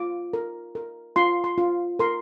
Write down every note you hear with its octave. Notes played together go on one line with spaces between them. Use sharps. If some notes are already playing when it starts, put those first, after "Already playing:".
Already playing: F4 D6
A#4
A#4
F4 C6
C6
F4
A#4 C6